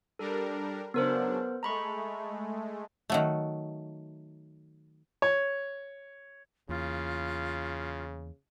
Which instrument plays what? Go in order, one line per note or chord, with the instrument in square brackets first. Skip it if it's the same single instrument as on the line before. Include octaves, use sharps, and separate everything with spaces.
[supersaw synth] G3 D4 A#4 [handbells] A4
[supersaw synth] C#3 F#3 D4 [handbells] B3 A#4 C5
[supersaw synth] G#3 A3 [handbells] A#5 B5 C#6
[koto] D#3 F#3 A3
[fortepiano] C#5
[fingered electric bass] E2 A#3 [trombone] C#3 [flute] F4